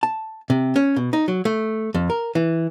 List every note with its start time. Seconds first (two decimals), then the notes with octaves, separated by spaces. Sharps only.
0.03 A5
0.50 C3
0.76 C#4
0.96 B2
1.13 D#4
1.28 F#3
1.45 A3
1.94 F2
2.10 A#4
2.35 E3